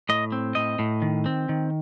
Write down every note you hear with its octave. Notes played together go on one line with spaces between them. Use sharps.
A2 D#5
C4
A2 D#5
A2
D#3
C4
D#3